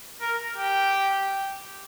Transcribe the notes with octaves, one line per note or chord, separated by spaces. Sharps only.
A#4
G4